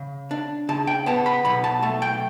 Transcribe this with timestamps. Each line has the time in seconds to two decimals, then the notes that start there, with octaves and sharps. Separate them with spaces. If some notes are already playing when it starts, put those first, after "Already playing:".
Already playing: C#3
0.31 D4
0.69 C#3 A5
0.87 G5
1.06 B3 A5
1.26 B5
1.45 B1 B5
1.64 A5
1.83 A3 A5
2.02 G5